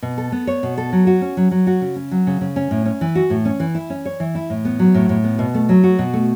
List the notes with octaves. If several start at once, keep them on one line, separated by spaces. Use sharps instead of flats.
B2
A4
B3
C#5
B2
A4
F#3
F#4
C#4
F#3
F#3
F#4
C#3
C#4
F#3
C#3
C#3
C#4
A2
C#4
E3
F#4
A2
C#4
E3
E4
C#4
C#5
E3
E4
A2
B3
F#3
A2
A2
B3
B2
A3
F#3
F#4
B2
A3